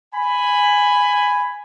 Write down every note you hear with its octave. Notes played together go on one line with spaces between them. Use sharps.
G#5 B5